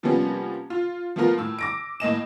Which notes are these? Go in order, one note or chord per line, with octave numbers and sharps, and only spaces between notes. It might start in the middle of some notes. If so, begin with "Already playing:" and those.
C3 F3 G3 A#3 B3 C#4
F4
F3 A3 B3 F4 A#4
A2 E6
D6 A#6 D7
A2 A#3 D#5 E7